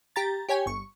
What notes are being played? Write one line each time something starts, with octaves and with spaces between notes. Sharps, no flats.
G4 A#5 A6
G4 C#5 G5 G#5
G1 C#6